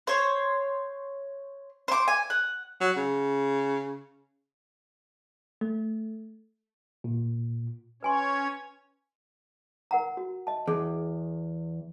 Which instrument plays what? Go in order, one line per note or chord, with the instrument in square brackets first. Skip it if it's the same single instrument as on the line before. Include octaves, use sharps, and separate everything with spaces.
[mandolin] C5 C#5
C5 D6
G#5
F#5
[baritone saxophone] F#3
C#3
[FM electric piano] A3
[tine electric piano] A#2
[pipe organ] C#4 C#5 [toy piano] B4 G#5 C6
[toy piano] A#4 F#5 A#5
F#4
D#5 A5
[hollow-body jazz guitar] E2 [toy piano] G#4